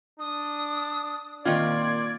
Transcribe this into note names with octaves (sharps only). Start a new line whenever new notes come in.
D4 D#6
A#2 D#3 C4 F4 D5 G#6